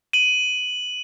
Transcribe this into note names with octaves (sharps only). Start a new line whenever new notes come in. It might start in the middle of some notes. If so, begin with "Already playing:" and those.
D#7 F#7